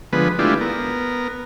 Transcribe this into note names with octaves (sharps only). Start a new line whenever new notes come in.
D3 F3 G#3 B3 B4
G#3 A3 D4 E4 F4 G4
B3 A#4